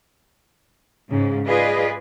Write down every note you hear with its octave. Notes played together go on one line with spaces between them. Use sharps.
G#2 C#3
F4 G#4 B4 D5 D#5